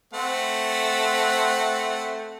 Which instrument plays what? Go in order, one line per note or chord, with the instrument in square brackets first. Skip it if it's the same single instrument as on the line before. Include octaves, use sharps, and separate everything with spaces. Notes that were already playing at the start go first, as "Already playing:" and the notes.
[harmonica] A3 C4 F#5